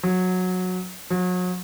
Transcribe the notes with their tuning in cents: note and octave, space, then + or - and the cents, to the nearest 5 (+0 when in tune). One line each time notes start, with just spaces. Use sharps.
F#3 -15
F#3 -35